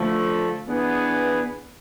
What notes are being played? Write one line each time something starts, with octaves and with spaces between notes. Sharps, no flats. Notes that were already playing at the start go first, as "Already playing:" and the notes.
Already playing: D3 F3 A3
E3 B3 D4 G#4 B4